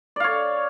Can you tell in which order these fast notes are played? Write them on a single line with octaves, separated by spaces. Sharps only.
D5 F5 C#5